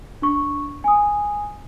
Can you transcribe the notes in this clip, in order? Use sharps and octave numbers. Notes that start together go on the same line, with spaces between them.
D4 C#6
G#5 D#6